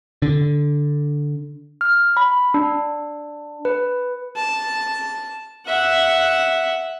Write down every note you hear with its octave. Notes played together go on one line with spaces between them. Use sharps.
D3
F6
B5
D4
B4
A5
E5 F#5